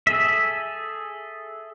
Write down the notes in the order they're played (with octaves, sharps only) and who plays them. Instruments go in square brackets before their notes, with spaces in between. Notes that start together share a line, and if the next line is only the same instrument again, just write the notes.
[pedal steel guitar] G#4 A4 E5